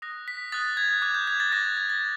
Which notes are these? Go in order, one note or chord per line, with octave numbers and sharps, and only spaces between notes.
D#6 F#6 A#6
B6
D#6 F#6 A6
G#6
D6 F#6 G#6
G6
G#6
A6
D6 F#6 A#6
G#6
G#6
A6